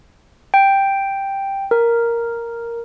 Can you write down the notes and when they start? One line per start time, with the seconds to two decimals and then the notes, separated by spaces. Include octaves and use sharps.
0.54 G5
1.71 A#4